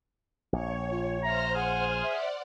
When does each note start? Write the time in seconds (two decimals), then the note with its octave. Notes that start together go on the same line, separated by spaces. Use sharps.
0.53 A#1 C#5
0.91 F4
1.23 C5 E5 A#5 C6 F6
1.55 G#4 F#5
2.03 D5 E5 F#5